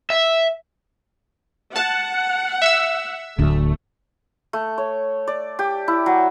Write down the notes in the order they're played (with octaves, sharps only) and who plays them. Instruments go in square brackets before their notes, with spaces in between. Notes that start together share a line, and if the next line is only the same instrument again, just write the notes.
[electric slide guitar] E5
[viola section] F#5 [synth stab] A5
[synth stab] E5 E6
[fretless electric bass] D1 D2 [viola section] A3
[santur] A3
C#5
D5
G4
E4
F#3